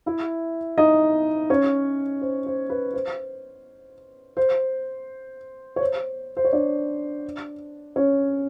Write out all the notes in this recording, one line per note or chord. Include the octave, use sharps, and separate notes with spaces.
E4 E5
D#4 D#5
C#4 C#5
C5
C5
B4
C5
C5
C#5
C5
C5
C#5
D4 D5
C#4 C#5